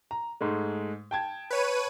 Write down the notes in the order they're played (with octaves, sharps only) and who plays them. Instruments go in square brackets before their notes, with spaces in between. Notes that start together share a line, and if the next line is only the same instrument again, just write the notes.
[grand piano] A#5
G#2 G#3 A3
G5 A5 G#6
[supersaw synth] B4 C#5 D#7